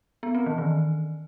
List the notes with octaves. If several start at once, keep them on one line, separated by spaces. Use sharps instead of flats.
B3
C4
E3
D#3